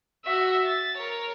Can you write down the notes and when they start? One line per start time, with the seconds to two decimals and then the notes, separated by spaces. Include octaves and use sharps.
0.24 F#4 E5
0.66 A6
0.97 A#4 C#5